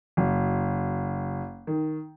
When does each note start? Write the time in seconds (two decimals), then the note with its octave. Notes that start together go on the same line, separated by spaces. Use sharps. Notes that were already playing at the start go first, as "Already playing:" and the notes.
0.17 F#1
1.67 D#3